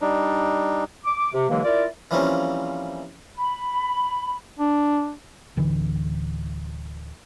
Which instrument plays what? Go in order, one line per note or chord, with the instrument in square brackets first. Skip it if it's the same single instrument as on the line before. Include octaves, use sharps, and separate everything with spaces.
[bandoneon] G3 D4 D#4
[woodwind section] D6
C3
D#2 D3 E3 F#3 G#3 A#3
E4 F4 A#4 D5
[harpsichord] E3 F3 G3 A#3 C4 C#4
[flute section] B5
[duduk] D4
[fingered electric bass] D1 D3 E3